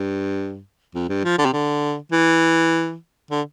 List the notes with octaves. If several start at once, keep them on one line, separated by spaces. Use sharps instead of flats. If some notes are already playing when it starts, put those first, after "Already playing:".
Already playing: G2
F2
G2
F3
D3
C3
D3
E3
D3